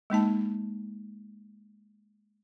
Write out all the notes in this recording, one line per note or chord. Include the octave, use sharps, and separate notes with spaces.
G#3 A#3 D#4 A5